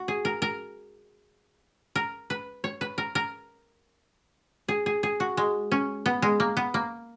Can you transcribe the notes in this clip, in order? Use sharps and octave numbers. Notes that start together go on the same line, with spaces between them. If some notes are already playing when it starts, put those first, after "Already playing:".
Already playing: F#4
G#4
A#4
A#4
A#4
B4
C#5
B4
A#4
A#4
G#4
G#4
G#4
F#4
G#3
C#4
B3
G#3
A#3
B3
A#3